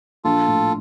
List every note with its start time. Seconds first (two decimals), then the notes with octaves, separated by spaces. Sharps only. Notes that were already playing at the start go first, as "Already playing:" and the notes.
0.24 A#1 F4 A4
0.48 A2